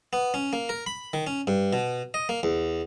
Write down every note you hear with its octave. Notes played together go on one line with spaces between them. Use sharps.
B3
C#4
A#3
A#4
B5
D#3
C#4
G2
B2
D#5
A#3
E2